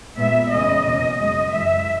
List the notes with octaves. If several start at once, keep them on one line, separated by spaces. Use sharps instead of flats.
A#2 G#3 B3 E5
E2 C#3 G#3 C#4 D#5
E2 B2 A#3 C#4 D#5
F#2 C#3 G#3
F#2 E3 G#3 E5